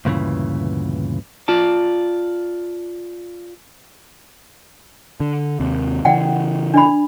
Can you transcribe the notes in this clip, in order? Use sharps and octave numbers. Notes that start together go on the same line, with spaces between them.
D2 G2 A#2 C#3 E3
F4 D5 A5
D3
D#2 C3
C#3 E3 D5 F#5 G5
D4 D5 B5